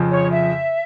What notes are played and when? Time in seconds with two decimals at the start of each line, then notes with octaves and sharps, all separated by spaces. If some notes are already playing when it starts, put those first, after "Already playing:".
Already playing: F2 C#3 F3
0.10 C#5
0.32 E5